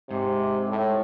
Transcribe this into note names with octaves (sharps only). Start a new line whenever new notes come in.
G#2 C3
A2